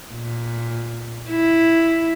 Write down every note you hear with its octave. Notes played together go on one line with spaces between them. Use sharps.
A#2
E4